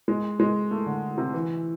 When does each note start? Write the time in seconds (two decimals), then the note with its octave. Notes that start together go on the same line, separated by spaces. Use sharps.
0.08 G#3
0.40 G#3
0.71 A3
0.86 D3
1.18 C3
1.34 E3